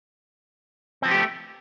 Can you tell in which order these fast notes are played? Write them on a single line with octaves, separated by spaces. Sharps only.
C4 F3 B3 G4 A3